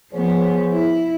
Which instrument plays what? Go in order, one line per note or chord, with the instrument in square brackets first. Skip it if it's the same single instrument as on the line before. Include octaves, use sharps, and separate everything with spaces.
[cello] F3 B3 [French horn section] G#4 C5 C#5
[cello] E4